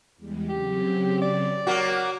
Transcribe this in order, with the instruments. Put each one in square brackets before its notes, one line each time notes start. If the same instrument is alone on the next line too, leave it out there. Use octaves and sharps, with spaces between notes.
[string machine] E2 G3 G#3
[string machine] C#3 F#3 C4 [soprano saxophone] G4
[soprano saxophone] D5
[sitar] F#3 A#3 F#4 [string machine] D6